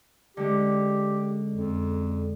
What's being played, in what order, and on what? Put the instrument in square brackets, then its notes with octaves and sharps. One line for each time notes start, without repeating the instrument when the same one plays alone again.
[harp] D3 G#3 C#4 [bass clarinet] G4
[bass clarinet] F2